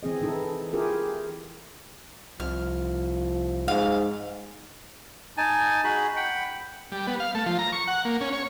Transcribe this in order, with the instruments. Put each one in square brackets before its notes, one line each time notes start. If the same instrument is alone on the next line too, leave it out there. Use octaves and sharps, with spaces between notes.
[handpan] E3 C4 G#4 D#5
E3 D#4 E4 A4
E4 F4 G4 G#4 A#4
[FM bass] C2 [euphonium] F3 [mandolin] F6
[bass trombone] G#2 [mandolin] F5
[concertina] D#4 G#5 A5
D#4 F#4 G#4 B5
F#5 G5 B5
[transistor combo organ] G3
B3
F5
A3
F3
A#5
C#6
F#5
A#3
C#4
C#5